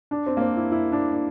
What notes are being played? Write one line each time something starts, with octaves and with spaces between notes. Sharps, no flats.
D4
C4
A#3
C4
E4
E4
D4
D4